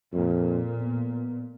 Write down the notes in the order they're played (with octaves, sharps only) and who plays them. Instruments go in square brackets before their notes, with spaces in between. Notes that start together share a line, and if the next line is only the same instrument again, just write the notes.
[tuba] F2 [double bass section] A#2
[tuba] B3